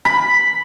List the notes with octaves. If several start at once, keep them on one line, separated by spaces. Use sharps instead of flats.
B5